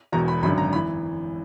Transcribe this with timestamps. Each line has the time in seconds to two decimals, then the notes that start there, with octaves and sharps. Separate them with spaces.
0.12 E1 E2 B2 A#5
0.28 B5
0.42 G#1 F#2 D3 B5
0.58 A#5
0.73 B5
0.76 E3